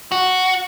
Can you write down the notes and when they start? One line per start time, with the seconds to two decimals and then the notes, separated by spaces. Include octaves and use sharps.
0.12 F#4